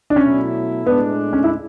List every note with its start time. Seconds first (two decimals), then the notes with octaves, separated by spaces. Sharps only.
0.10 D4
0.16 B2 F#3 A3 C#4 E4
0.86 A2 G#3 B3 D4
1.33 C#4
1.44 E4